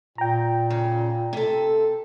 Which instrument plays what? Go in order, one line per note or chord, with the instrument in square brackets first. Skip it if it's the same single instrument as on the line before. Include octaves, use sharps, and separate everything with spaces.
[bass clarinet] A#2 [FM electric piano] G5 A#5
[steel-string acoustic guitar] C#3
C3 A4